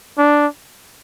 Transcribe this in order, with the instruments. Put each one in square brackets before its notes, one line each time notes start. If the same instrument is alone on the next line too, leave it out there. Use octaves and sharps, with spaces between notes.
[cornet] D4